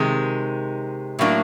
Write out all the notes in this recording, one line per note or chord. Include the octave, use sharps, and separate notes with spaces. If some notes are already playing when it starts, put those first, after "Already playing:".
Already playing: C3 D#3 G#3
A2 F#3 A#3 D4